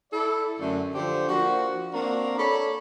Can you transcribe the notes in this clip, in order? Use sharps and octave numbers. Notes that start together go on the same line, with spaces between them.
E4 A4 D5
F#2 D3 A3
D3 F3 D4 G4 C5
F3 A#3 D4 F#4
A#3 C4 D4 F#4 A#4 A#5
A4 C#5 D5 B5